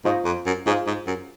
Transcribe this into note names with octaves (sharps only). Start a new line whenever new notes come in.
G#2 F4 C5 D#5 A#5 C#6
F2
F#2
G#2 F4 G#4 C5 F5
G#2
F#2